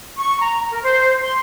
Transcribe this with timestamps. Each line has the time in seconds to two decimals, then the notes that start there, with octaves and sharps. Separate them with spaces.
0.17 C#6
0.40 A#5
0.70 A#4
0.82 C5
1.23 C6